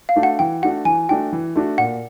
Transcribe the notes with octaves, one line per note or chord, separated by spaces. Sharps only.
F5
A3 D4 F#4
F#5
E3 G5
A3 D4 F#4 F#5
E3 G#5
A3 D4 F#4 G5
E3
A3 D4 F#4
A#2 F#5